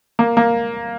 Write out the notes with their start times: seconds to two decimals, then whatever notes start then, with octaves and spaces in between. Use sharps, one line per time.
0.19 A#3
0.37 A#3